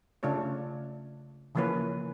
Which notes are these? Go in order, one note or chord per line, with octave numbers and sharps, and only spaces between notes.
C#3 A3 D4 F4 C#5
C#3 E3 F3 A#3 C#4 B4